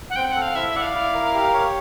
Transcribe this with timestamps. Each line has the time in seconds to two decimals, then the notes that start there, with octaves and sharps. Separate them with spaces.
0.10 F#5
0.16 C4 G5
0.29 F#5
0.35 A4
0.42 F5
0.55 E4 E5
0.69 E5
0.75 D5 F#5
0.82 F5
0.94 E4
1.14 A#4
1.34 G4
1.54 C#5